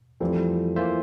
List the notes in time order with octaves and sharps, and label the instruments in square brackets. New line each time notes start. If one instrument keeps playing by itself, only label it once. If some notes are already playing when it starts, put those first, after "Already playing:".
[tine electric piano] F2 E3 G3 C4 [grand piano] F3 A3
[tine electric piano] E3 A#3 F4 C5 E5